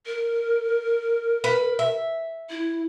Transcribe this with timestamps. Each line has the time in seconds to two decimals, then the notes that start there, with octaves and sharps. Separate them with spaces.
0.06 A#4
1.44 B4
1.79 E5
2.50 E4